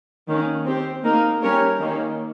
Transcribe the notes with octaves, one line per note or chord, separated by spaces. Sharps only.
D#3 A#3 C#4
C4 G4 C5
A#3 D#4 A#4
G3 C#4 G4 A#4 C#5
D#3 A#3 C#4